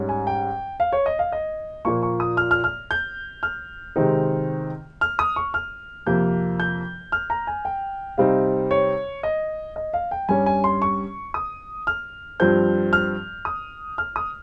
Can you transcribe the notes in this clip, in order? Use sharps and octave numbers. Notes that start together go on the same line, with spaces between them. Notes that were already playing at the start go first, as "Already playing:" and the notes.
Already playing: G#2 G3 C#4
G#5
G5
F5
C#5
D#5
F5
D#5
A#2 F3 A#3 C#6
C#6
D#6
F6
F6
F6
G6
F6
C3 D#3 G#3 C4 D#4
F6
D#6
C#6
F6
F2 C3 F3 A#3 G6
G6
F6
A#5
G#5
G5
C3 G3 C4 D#4 F5
C#5
D#5
D#5
F5
G5
G2 G3 C#4 G#5
G#5
C6
C#6
D#6
F6
G2 F3 C4 G6
F6
D#6
F6
D#6